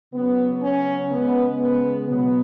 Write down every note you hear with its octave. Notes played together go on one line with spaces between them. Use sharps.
C#3 F#3 B3
C#4
C#3 G#3 B3
B3
B2 F#3 B3